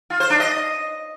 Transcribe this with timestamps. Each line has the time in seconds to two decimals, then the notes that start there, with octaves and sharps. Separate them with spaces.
0.10 F4
0.20 C5
0.30 D4
0.40 D#5